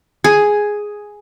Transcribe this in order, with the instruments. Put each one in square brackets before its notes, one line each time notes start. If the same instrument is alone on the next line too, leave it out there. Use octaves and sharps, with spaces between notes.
[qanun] G#4